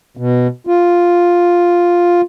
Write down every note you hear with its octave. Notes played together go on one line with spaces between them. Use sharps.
B2
F4